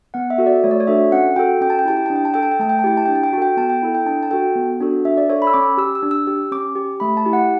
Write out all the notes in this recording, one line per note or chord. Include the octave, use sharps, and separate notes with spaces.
B3 F#5
E5
F#4 A4
D5
A3 C#5
D5
C#5
D4 F#4 A4 E5
C#4 F#5
F#4 A4 G5
C#4 G5
A5
G5
E4 G4 A5
G5
A5
D4
G5
A5
A4 G5
A5
G5
A3 A5
G5
A5
E4 G4 G5
A5
D4 G5
A5
G5
F#4 A4 G5 A5
B3 A5
G5
E4 A4
G5
D4 A5
A5
F#4 A4 G5
B3
D4 F#4 A4
D4 E5
D5
A4 C#5
B5
E6
C#4 D6
G4 E6
E6
D4
E6
G4
C#4 D6
G4
A3 B5
A5
E4 G4
F#5